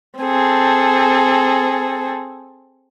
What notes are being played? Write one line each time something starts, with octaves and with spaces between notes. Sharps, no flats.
C4 G#4 A4